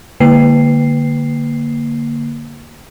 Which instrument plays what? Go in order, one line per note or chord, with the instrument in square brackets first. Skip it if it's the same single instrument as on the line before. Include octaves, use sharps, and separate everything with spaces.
[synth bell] D3 A#3 C7